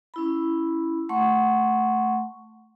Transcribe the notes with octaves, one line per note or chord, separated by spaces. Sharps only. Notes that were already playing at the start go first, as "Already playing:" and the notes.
C#4 E4 B5
A3 F#5 C6 C#6